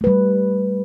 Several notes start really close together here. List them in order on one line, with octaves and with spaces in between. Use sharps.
A3 B4 G3